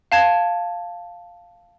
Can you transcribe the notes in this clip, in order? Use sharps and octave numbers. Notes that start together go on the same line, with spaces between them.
F5 A5 G#6